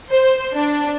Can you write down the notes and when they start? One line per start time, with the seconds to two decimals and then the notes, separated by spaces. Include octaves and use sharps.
0.11 C5
0.53 D4